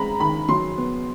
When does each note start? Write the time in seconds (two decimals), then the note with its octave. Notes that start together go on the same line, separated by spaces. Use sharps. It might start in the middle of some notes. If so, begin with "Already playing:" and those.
Already playing: G#3 C4 A#5 B5
0.20 D#3 B5
0.49 F#3 C6
0.78 B3